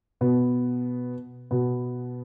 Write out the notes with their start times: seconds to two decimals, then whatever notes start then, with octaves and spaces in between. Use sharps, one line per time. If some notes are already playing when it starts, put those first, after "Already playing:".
0.21 B2 B3
1.51 B2 B3